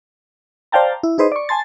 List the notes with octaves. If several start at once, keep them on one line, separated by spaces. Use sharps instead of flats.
C5 D5 F5 G5 A5 A#5
E4
D#4 G#4 B4 C5 D#5
D5 C#6
G#5 A5 C6 A6